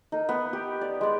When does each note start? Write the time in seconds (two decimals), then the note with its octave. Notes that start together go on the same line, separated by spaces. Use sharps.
0.12 D#4 A#4
0.29 B3
0.53 G4
0.81 D5
1.01 G#3 D5